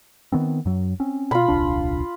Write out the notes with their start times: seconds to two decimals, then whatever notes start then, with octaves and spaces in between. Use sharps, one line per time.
0.32 D#3 B3 C4
0.65 F#2 F#3
1.00 C4 C#4
1.31 B2 F4 B5
1.48 D#1 C2 D4